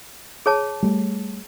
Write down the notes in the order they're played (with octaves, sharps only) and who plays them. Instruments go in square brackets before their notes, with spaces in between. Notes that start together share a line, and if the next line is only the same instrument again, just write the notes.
[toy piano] G#4 C#5 A5
[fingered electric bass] G3 A3